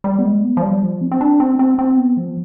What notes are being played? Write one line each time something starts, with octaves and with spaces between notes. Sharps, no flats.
G3
B3
G#3
B3
F3
G3
F3
C4
C4
D4
C4
C4
C4
B3
F3